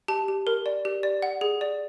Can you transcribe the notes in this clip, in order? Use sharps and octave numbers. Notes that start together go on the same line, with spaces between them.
G4 A5
G4
A#4
D5
G4
D5
F#5
G#4
D5